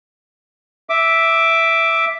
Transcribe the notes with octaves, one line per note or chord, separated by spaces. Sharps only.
E5 D6